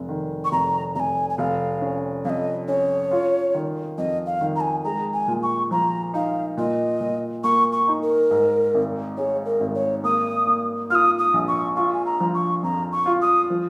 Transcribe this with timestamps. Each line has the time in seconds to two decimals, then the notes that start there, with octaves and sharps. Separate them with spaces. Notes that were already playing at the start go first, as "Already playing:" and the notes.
Already playing: F1
0.09 D#3
0.45 C#6
0.52 F1 A#5
0.95 F1 A#5
1.00 G#5
1.30 G#5
1.38 F1 F5
1.81 C#4
2.25 F2 D#5 F5
2.68 C#4 C#5
3.11 F4
3.54 D#3
3.98 F2 D#5
4.26 F5
4.41 D#3
4.56 A#5
4.61 G#5
4.85 G#3 A#5
5.13 G#5
5.28 A#2
5.43 C#6
5.71 F3 A#5
6.14 D#4 F5
6.57 A#2 D#5
7.01 A#2
7.44 A#3 C#6
7.72 C#6
7.88 D#4
8.02 A#4
8.31 G#2
8.74 G#1
9.17 G#3 C#5
9.46 A#4
9.60 G#1
9.75 C#5
10.04 A#3 D#6
10.47 A#3
10.90 F4 F6
10.95 D#6
11.19 D#6
11.34 A#1
11.48 C#6
11.76 F4 C#6
11.93 G#5
12.06 A#5
12.20 F3
12.35 C#6
12.63 F2 A#5
12.92 C#6
13.06 F4
13.22 D#6
13.50 F3